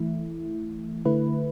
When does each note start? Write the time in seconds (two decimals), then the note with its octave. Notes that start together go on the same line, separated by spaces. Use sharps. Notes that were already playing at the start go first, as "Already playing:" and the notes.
Already playing: E3 A3 E4
1.05 D3 A3 E4 B4